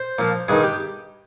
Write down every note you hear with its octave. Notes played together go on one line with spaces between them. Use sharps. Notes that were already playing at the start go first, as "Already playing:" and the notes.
Already playing: C5
A#2 F3
G2 D#3 G#4
G4